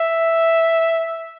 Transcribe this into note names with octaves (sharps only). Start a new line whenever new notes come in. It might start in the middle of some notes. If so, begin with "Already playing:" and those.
Already playing: E5